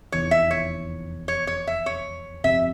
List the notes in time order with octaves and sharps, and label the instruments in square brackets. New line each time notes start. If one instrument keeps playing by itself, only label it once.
[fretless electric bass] F1 E2 E3 [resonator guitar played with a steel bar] C#5
[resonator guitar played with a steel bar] E5
C#5
C#5
C#5
E5
C#5
[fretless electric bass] G1 F2 C3 [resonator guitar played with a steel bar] E5